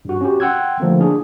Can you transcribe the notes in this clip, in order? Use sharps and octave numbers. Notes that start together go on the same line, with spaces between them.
G2 F#4
C#4 F#4 G4
F#5 G5 C6 E6 F#6 G#6
D3 F3 A3 A#3
D4 E4 G#4